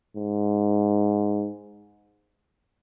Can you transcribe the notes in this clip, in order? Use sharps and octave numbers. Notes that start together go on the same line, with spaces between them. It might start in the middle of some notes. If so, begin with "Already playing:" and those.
G#2